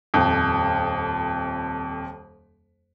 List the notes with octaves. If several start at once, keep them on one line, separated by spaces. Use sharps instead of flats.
D#1 F2